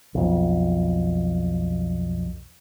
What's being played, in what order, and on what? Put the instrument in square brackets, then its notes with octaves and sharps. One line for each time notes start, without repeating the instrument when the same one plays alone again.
[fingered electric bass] B1 F2